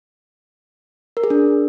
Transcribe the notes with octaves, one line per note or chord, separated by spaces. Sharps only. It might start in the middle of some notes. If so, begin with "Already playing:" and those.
A#4
G#4
D4